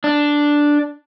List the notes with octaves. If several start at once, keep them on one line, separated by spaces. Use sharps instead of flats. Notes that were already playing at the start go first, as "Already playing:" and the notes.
D4